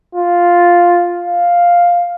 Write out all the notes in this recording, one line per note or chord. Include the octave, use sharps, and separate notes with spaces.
F4
F5